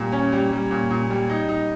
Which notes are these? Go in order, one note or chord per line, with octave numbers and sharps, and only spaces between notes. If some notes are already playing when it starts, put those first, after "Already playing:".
Already playing: A#2 G3
C#4
G3
G3
A#2
A#2
G3
D#4
D#4